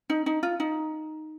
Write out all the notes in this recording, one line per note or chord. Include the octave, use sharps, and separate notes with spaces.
D#4
D#4
F4
D#4